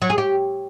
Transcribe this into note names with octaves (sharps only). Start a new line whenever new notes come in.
F#3
G#4
G4